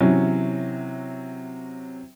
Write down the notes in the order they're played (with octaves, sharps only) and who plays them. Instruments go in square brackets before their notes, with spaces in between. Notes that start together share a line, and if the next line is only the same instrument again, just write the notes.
[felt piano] C3 E3 F#3 C#4